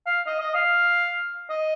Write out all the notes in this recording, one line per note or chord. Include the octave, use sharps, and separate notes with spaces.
F5
D#5
D#5
F5
D#5